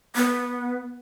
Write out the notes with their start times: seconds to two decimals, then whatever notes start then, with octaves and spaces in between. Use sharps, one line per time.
0.16 B3